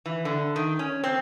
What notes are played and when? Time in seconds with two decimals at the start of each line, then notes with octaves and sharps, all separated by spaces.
0.06 E3
0.25 D3
0.56 D#3
0.79 C#4
1.04 C4